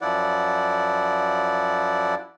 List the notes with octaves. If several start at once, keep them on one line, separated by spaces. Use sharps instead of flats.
F#2 F3 E4 D5 F#5